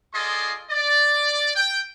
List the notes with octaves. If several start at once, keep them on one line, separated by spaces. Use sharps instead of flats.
F4 G#4 A4 D5 D#5 C6
D5
G5